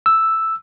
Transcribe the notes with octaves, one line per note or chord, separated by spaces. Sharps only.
E6